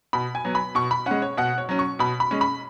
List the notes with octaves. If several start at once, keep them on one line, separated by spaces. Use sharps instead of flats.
B2 B5
G#5
F#3 B3
B5
B2 C#6
B5
G#3 C#4 F#5
C#5
B2 F#5
C#5
F#3 C#4
C#6
B2 B5
B5
G#3 C#4
B5